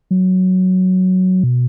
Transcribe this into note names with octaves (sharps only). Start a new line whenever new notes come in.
F#3
B2